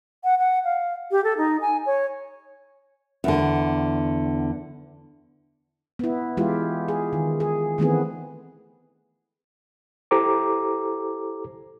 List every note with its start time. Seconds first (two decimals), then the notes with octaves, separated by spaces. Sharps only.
0.24 F#5
0.39 F#5
0.65 F5
1.11 G4
1.24 A4
1.38 D#4
1.61 G#5
1.86 C#5
3.24 E2 D3
5.99 B3 E4
6.37 E3 G#3 E4 F4 G4
6.88 G#4
7.13 D#3
7.40 G#4
7.78 D#3 E3 A3 B3 C4 G#4
10.11 E4 G4 A4 C5 A#5 D6